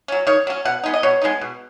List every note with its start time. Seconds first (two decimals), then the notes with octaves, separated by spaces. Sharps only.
0.08 F#3 C#4
0.27 D#3 C#5
0.47 F#3 C#4
0.65 B2 F#5
0.83 G#3 B3 D#4
0.94 D#5
1.03 B2 C#5
1.22 G#3 B3 D#4
1.41 B2